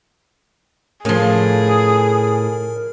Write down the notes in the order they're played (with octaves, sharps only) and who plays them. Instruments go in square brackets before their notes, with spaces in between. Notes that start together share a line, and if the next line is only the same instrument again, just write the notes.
[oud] A2 [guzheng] C#3 F3 [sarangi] G#4 [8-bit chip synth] A#4